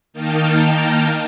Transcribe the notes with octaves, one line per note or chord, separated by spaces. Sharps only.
D#3 A#3 D#4 G5 A5 F6